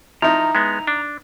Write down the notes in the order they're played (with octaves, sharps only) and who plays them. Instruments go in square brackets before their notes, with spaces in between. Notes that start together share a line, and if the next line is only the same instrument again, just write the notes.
[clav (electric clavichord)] F3 [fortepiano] D#4 E4 [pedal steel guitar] A#5
[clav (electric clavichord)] G#3 B3
D4